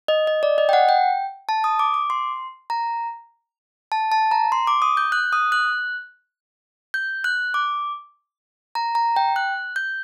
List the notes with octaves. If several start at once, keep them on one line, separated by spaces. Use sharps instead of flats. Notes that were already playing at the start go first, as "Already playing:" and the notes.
D#5
D#5
D5
D#5
G5
F#5
G5
A5
D#6
D6
D6
C6
A#5
A5
A5
A#5
C6
D6
D#6
G6
F#6
D#6
F#6
G6
F#6
D6
A#5
A#5
G5
F#6
G6